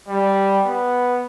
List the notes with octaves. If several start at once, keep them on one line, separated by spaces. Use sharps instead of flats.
G3
B3